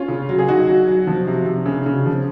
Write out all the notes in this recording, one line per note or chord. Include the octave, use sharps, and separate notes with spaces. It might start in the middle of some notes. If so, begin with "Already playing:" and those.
Already playing: C#4 F4
C#3
F#3
G#4
F#3 D#4 F#4
F#3
F#3
F3
C3
C3
C#3
C#3
F3